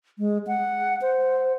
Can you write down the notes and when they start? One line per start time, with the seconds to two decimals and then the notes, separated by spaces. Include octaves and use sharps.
0.19 G#3
0.47 F#5
1.01 C5